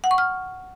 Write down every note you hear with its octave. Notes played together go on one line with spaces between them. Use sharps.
F#5
C#6
F6